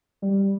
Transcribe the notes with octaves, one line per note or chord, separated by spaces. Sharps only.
G3